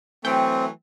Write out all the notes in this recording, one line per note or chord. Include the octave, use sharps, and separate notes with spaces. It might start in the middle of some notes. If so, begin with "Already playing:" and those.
E3 F#3 A3 C4 G5